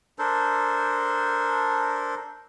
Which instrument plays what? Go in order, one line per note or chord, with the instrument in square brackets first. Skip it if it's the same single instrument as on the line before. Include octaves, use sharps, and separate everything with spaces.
[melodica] D4 A4 A#4 C5